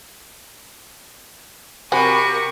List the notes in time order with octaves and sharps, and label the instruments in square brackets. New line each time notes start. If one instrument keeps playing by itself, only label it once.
[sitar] C3 [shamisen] C4 F#4 G#5 [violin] A#4 C#6 [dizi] B5